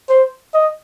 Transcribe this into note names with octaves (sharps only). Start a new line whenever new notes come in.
C5
D#5